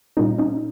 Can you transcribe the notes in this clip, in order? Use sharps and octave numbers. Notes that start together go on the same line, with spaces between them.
A#2 G3 A#3 C#4 D#4
C#4 D#4